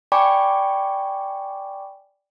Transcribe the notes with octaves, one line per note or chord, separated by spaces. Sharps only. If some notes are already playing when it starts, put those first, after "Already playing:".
D5 G5 G#5 B5 C#6 D6